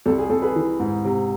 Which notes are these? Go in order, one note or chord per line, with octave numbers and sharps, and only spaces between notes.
C2 A4
G#4
C2 A4
G#4 B4
E3
G#2
C3